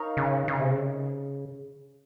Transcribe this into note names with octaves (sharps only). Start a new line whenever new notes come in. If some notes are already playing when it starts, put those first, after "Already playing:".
Already playing: D#4 A#4 C#5 F5
C#3
C#3
C3
C#3